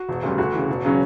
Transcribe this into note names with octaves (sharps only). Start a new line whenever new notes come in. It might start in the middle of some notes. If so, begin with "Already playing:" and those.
Already playing: F#4
E1
D2 C#3 G3
D2 F#4
C#3 E3
E1
C#3 F#3 C#4